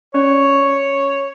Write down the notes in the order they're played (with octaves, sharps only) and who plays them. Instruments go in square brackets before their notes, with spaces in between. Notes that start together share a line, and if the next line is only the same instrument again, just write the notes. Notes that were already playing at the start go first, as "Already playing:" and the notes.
[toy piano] C#4 D5 [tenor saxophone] C#5